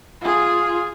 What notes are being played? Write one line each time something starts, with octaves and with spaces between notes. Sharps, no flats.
F4 G#4